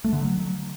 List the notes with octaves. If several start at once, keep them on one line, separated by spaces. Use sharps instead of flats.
A3
D3
F#3